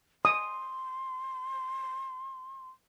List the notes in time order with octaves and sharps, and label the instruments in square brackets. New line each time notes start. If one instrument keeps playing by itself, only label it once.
[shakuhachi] C6 [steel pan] D#6